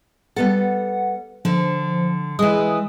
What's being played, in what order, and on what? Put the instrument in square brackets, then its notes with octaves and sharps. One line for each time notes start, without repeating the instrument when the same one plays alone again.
[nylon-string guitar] G3 B3 A4 [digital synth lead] F#5
[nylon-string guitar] D3 [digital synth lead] F3
[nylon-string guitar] E3 G#3 [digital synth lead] D#6